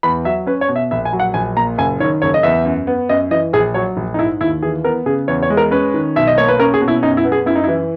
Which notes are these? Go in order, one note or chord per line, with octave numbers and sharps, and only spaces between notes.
E2 B5
F#3 E5
C#4 B4
C#5
B2
E5
A#1 E5
G#5
F#3
F#5
A#1 G#5
A#2 A#5
F#1 G#5
D#3 C#5
F#1 C#5
D#5
E2 E5
F#2
B3
F#2 D#5
E3 D#5
A#1 G#4
F#3 C#5
A#1
D#4
G#2 E4
D#2 E4
E3 G#4
B3 A#4
C#3 G#4
E2 C#5
C#5
G#3
A#4
C#4 B4
D#3
B1 E5
D#5
A#3 C#5
B4
C#4 A#4
G#4
B2
E4
F#2 D#4
E4
B3
G#4
F#2 E4
D#4
E4
E3